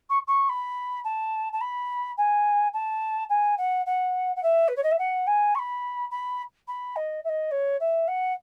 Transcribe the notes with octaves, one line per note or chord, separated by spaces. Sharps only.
C#6
C#6
B5
A5
A5
B5
G#5
A5
G#5
F#5
F#5
F#5
E5
B4
C#5
D#5
E5
F#5
G#5
C#6
B5
B5
B5
D#5
E5
D#5
C#5
E5
F#5